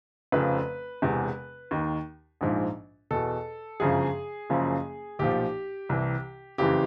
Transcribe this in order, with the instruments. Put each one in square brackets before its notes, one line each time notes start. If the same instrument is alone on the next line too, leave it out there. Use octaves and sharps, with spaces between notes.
[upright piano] F1 F2 C#3 F3 B4
E1 E2 C3
D#2 D#3
A#1 G#2 F3
E2 B2 A4
G1 F#2 C#3 F3 G#4
F#1 F#2 C#3 F3
B1 A#2 F3 G4
C2 C3 E3
F#1 F2 C#3 E3 G4